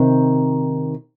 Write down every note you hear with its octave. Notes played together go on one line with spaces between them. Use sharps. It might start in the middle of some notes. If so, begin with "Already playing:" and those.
Already playing: C3 D#3